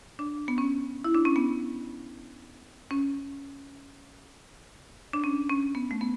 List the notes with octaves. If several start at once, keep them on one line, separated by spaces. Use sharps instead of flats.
D4
B3
C#4
E4
D4
C#4
B3
C#4
D4
C#4
C#4
B3
A3
B3